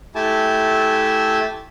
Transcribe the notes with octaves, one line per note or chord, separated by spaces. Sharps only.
A3 E4 G4 G#5 A5